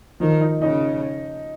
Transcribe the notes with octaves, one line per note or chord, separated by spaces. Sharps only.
D#3 F3
D#4
C#3 D#4